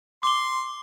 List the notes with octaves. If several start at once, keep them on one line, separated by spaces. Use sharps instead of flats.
C6 D6 G7